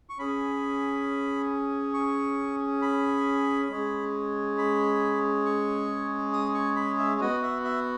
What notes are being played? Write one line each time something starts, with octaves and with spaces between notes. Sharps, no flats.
C#6
C#4 G#4 B5
C#6
B5
G#3 C#4 G#4
B5
C#6
D#6
C#6
B5
E5
B3 F#4 D#5
E5
E5